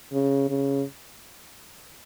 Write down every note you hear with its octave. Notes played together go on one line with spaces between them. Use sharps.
C#3
C#3